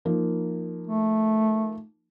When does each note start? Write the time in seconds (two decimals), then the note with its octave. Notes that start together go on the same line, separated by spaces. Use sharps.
0.05 F3 A#3 D#4
0.86 A3